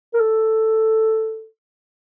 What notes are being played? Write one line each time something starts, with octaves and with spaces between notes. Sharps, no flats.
A#4
A4